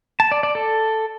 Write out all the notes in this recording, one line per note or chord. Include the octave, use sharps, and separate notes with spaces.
A5
D5
D5
A4